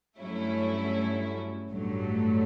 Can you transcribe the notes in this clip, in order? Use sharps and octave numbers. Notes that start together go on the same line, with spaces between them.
G2 F#3 A3 C#4 E4
A1 G2 F#3 A3